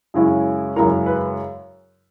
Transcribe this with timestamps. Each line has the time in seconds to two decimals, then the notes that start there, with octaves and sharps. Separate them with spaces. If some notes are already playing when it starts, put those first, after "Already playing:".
0.14 F#2 C#3 G#3 C#4 E4
0.76 F#2 C#3 G#3 C#4 E4 A#4 A#5
1.06 B4